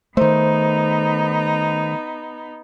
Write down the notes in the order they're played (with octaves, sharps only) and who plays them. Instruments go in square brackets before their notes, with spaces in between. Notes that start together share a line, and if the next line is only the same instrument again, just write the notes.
[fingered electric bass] D#3 A3 [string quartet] B3 D#4 [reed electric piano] C5